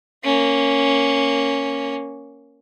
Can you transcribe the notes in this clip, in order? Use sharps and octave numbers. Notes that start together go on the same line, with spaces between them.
A#3 C#4